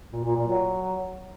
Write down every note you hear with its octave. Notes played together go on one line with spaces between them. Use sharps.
A#2
A#2
A#2
F#3